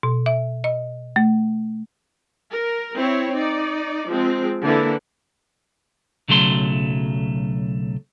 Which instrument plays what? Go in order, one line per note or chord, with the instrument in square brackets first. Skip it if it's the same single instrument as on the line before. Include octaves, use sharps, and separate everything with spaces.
[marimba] B2
E5
D#5
A3
[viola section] A#4
C4 E4 C#5
D#4 D5
F3 G#3 C4
D3 E3 A#3 E4
[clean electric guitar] B1 C#3 F#3 A3 C6